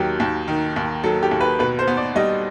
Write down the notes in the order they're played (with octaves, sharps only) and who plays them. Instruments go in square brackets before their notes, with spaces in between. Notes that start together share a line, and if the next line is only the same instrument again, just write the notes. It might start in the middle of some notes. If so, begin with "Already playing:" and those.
Already playing: [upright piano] D#2 D#3 F#3 G4
D#2
D#3
D#2
F#3 A4
G4
D#2
B4
B2 B4
C5
B3
D5
G3 D#5